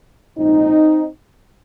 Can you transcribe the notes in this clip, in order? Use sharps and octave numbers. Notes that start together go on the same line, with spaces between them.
A#1 G#2 F3 C4 D#4